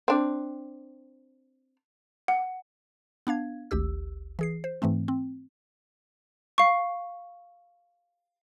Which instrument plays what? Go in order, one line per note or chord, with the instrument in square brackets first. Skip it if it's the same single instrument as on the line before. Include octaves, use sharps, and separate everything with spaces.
[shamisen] C4 D4
[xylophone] F#5
[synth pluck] B3 D4 F5 G#6
G#1 D2 G4 E6
E3 G#4 C7
C5
G#2 E3 A3 C4
C4
[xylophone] F5 C#6